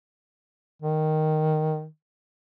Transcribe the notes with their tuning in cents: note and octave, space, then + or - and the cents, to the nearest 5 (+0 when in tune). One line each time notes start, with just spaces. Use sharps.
D#3 -5